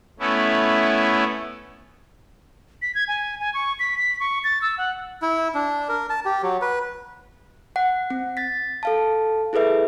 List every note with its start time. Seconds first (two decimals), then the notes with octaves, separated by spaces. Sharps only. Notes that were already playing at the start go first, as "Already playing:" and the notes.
0.20 A3 B3 C#4 E4
2.82 B6
2.95 G#6
3.08 G#5
3.40 G#5
3.54 C#6
3.79 B6
3.98 B6
4.20 C#6
4.44 A6
4.62 E6
4.78 F#5
5.22 E4
5.54 D4
5.89 A#4
6.10 A5
6.25 G4
6.43 F#3
6.62 B4
7.76 F#5
8.10 C4
8.37 A6 B6
8.83 A4 F5 A5
9.53 E4 G#4 A4 B4 E5